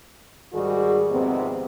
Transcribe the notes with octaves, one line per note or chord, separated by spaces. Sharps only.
G#2 D#3 G3 F#4 G#4
F2 G#2 C3 D#3 B3 C4